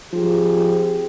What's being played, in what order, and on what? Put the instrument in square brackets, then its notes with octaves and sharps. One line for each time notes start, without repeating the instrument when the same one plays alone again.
[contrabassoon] F3 [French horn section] C4 G4 G#4